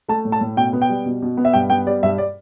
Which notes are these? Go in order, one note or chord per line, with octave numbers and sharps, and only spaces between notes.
A3 A5
A2
A5
A2
B2 G5
B3
G5
G3
B2
B2
B3
E5
G2 G5
B3 G5
G3 D5
G2 E5
D5